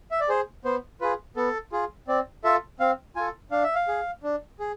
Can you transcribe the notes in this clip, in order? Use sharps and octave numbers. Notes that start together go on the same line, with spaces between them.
E5
D5
G#4 C5
B3 C5
F4 G#4 B4
B3 A4
F4 G#4
C4 D5
F4 A4 E5
C4 F5
F4 A4 G#5
D4 F5
E5
F5
G#4
D4
G#4